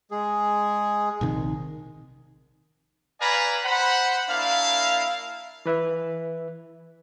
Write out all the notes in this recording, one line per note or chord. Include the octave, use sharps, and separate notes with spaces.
G#3 G#4
A#1 C3 D#3
B4 D5 F5 G#5 A#5 B5
C5 F#5 B5
A#3 D4 E4 F5
E3 B4 E5